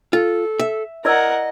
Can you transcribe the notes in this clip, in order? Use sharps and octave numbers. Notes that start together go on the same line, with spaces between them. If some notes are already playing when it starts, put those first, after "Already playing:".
F4 A4
E5
E4 A#4 D5 D#5 F#5 E6